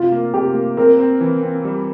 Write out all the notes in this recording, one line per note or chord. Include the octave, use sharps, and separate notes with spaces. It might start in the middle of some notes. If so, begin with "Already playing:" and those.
Already playing: C3 F4
A#3
C3 G4
A#3
C4 A#4
C4
E3
C4
G3